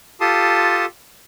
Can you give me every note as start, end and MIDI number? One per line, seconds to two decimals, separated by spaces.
0.21 0.86 65
0.21 0.86 67
0.21 0.86 69
0.21 0.86 81
0.21 0.86 84
0.21 0.86 87